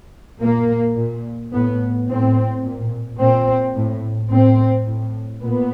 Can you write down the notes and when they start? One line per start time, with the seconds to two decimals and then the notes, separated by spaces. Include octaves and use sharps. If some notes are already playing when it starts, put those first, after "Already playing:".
0.40 A#2 A#3
0.96 A#2
1.52 A2 B3
2.08 A2 C4
2.64 A#2
3.19 A#2 C4
3.74 A2
4.30 A2 C4
4.86 A2
5.42 A#2 B3